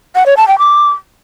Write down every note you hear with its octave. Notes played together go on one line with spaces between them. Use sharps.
F#5
C#5
A5
G5
D6